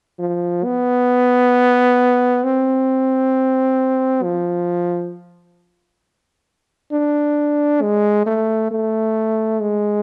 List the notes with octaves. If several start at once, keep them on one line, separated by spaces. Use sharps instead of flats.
F3
B3
C4
F3
D4
G#3
A3
A3
G#3